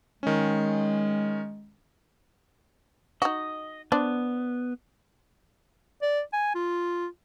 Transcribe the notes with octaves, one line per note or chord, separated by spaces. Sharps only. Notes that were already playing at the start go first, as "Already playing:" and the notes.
D#3 G#3 C#4
D#4 F#4 D#5
B3 D4 C5
D5
G#5
F4